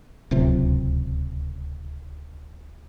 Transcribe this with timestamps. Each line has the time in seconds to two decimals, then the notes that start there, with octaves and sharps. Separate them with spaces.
0.31 D1 C#2 C3